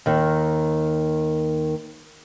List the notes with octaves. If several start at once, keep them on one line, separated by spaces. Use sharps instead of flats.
D#2 D#3